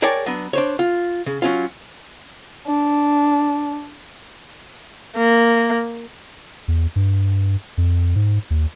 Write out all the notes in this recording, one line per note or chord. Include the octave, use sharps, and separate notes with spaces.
G#4 A#4 C#5 D5 G5 A5
F#3 B3 D4
D4 C5 C#5
F4
C#3
F#3 C#4 F4
D4
A#3
E2
G2
F2
G#2
D#2